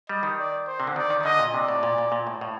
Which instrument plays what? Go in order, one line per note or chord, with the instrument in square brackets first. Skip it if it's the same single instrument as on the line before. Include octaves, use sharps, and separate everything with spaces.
[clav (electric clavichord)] G3 [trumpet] D#5
[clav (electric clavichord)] D#3
[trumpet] D5
C5
[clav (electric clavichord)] C3
D3
[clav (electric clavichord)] D#3 [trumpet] D5
[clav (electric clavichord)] D#3
D#3
[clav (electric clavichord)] D3 [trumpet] D#5
[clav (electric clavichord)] A#2
[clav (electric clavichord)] C3 [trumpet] D5
[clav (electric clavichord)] A2
A#2
A#2
A#2
A2
A2